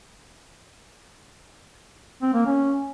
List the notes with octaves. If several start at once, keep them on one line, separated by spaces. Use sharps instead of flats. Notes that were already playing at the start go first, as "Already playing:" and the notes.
C4
A#3
C#4